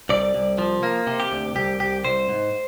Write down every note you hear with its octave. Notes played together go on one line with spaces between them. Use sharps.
C2 D5
C2
F3
A#3
C3
G4
D2
C2 G4
C2 G4
C2 C5
G#2